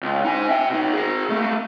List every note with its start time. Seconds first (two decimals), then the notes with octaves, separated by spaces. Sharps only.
0.03 C#2
0.24 D#4 G#5
0.49 E5 G5
0.70 B2 D#4
0.94 G#4 A#4
1.30 A3 A#3